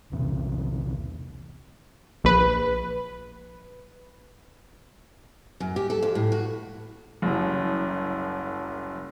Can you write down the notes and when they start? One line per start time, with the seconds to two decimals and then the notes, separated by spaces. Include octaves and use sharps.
0.12 B1 E2 C3
2.24 A#1 B4
5.60 F#2
5.76 G4
5.90 A4
6.03 F2
6.15 A2
6.32 F#4
7.22 F#1 C2 F#2